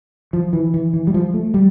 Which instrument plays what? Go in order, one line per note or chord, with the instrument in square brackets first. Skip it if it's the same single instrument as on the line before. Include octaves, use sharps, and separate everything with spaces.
[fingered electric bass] F3
E3
E3
E3
G3
F3
A3
G3